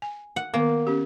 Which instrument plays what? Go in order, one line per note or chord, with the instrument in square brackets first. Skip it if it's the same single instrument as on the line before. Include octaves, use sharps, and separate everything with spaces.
[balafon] G#5
[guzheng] F#5
[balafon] D#3 B3 [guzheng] A#3
[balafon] C#4 G4